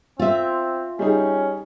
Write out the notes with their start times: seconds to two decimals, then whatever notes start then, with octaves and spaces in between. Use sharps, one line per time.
0.19 C4 F4 E5
0.99 G3 C#4 D#4 G#4